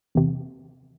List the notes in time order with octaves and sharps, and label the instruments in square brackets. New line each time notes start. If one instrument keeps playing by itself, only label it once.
[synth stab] E2 C3